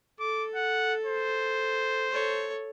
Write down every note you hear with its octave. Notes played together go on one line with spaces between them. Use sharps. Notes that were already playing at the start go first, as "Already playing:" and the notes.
A4 D6
F#5
C5
A4 C#5